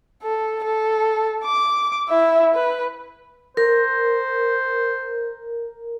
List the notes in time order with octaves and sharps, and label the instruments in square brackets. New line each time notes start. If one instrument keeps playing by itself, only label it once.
[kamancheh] A4
A4
D6
E4 E5
B4
[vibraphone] A#4 [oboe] C5